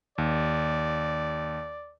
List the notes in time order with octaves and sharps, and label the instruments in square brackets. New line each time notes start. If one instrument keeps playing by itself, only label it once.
[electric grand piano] D#2 [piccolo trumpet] D5